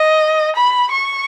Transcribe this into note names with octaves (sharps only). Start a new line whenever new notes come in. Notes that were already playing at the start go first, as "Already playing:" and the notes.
Already playing: D#5
B5
C#6